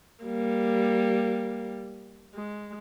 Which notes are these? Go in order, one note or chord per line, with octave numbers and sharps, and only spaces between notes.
G3 A#3
G#3